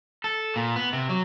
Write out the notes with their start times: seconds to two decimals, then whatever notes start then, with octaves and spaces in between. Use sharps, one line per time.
0.24 A4
0.56 A#2
0.76 B3
0.93 C3
1.09 F#3